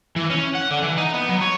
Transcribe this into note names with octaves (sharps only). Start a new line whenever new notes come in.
E3
C#4
F#5
D3
E3
D#4
B3
F#3
C#5